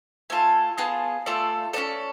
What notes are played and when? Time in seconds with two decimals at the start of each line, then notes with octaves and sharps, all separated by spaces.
0.30 A3 F4 A4 G#5
0.78 B3 F4 G#4 A5
1.26 A3 F4 A4 D5
1.73 C#4 F#4 A4 D5